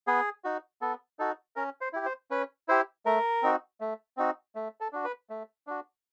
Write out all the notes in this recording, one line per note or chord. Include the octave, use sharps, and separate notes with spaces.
B3 G#4
D#4 F#4
B3 A4
D#4 F#4 A4
C#4 A#4
C5
E4 G4
C5
C#4 B4
E4 G4 C5
A3 A#4
C4 D#4 F#4
A3
C4 D#4 F#4
A3
A4
D4 F#4
B4
A3
D4 F#4